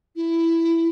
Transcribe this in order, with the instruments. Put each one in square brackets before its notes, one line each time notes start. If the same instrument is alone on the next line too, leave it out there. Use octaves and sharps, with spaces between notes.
[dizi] E4